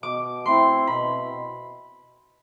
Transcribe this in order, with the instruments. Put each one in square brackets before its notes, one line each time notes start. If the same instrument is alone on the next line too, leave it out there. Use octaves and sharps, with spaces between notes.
[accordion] B2 [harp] D6
[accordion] A3 C4 E4 [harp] C6
[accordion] B2 [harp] B5